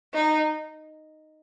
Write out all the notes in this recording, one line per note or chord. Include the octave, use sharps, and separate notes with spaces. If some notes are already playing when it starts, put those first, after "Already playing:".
D#4